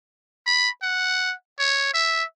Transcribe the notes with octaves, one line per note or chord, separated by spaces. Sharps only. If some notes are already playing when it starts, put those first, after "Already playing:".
B5
F#5
C#5
E5